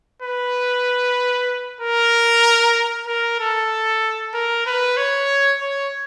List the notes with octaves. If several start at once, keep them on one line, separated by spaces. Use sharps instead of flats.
B4
A#4
A#4
A4
A#4
B4
C#5
C#5